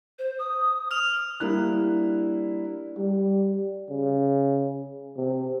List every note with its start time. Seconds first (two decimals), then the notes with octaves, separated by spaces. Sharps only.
0.19 C5
0.39 D#6
0.91 F6 F7
1.40 G3 A#3 D4 E4 F#6
2.97 G3
3.90 C#3
5.17 C3